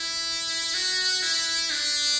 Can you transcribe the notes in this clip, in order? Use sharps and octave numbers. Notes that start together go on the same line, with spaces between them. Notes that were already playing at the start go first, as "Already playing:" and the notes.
Already playing: E4
F#4
E4
D4